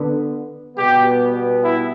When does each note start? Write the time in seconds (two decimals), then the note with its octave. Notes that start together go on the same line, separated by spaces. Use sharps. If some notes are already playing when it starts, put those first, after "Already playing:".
Already playing: D3 B3
0.76 B2 G3 B3 G4
1.63 E4